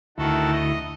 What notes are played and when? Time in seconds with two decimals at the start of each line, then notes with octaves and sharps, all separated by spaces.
0.18 D2 D#3 E4 F#4 A4
0.52 D#5